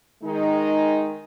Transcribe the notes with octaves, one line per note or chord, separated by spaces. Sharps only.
D#3 G#3 D#4